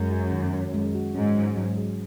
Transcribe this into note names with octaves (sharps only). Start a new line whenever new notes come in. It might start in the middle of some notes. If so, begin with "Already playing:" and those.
Already playing: F#2 G#3
F#4
D#3
C#4
G#3
F#4
G#2 C#4
F#3
F#3
G#4